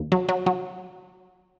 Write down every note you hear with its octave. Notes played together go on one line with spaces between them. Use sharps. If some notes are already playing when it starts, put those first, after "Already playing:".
Already playing: D#2
F#3
F#3
F#3